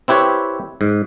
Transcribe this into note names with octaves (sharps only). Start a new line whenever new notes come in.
C4 E4 G4 B4 C#5
G#2